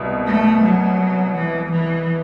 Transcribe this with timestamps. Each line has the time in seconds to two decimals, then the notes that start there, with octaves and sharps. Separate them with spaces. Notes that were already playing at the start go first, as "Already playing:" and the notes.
Already playing: C2 B2
0.27 A3
0.63 F#3
1.35 E3
1.72 E3